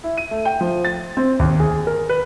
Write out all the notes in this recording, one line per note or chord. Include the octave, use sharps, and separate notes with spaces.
E4
D#7
A3
G5
F3
A6
C4
D#2
G#4
A#4
B4